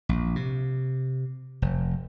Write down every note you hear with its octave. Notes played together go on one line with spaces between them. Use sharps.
A#1
C3
F1